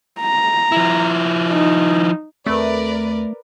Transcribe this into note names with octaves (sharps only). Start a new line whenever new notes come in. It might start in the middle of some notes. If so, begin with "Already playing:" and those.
A#5
F3 E4
D#4
D#2 A3 C4 A#4 B4 D5